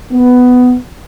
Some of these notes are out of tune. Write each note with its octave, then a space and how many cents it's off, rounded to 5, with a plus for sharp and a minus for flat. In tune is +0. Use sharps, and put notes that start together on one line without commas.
B3 +10